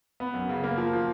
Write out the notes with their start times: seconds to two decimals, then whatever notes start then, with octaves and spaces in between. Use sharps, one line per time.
0.20 B3
0.34 F#2
0.49 C#3
0.64 A#3
0.77 F3
0.93 F3